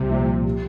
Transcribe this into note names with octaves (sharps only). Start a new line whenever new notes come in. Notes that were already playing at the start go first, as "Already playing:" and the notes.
Already playing: C2 C3
A#2 F3
C3